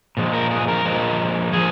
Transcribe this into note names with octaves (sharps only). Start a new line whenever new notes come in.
A#2 F3 G#3
A#4
G#4
A#4
A#2 F3 G#3
A#2 F3 G#4